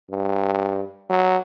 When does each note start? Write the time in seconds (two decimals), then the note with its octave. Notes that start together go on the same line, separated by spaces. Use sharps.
0.10 G2
1.09 F#3